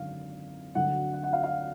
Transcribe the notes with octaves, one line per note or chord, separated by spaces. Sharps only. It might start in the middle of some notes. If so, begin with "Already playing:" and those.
Already playing: G#1 F#2 D3 F5
D2 D3 F#3 F#5
F#5
F#5
F5
F5